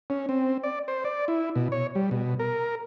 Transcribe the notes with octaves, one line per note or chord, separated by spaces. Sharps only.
C#4
C4
D5
C5
D5
E4
B2
C#5
G3
B2
A#4